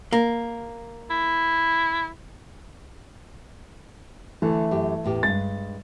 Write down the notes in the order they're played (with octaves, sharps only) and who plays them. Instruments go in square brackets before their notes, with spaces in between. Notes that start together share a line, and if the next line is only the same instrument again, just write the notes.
[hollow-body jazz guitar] A#3
[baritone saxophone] E4
[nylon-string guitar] D3 [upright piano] E3 A3
[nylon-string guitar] F#2 G4
E2 A2 G4
[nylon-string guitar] G2 G#3 [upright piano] A6